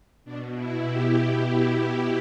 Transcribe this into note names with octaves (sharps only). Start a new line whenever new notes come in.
B2 D4
E4
G4
E4
E4